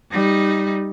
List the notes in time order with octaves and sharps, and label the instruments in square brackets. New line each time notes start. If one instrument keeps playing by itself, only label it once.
[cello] G3 D#4